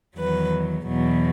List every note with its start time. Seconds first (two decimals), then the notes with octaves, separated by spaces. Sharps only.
0.17 E2 D#3 F#3 B4
0.85 E2 B2 F#3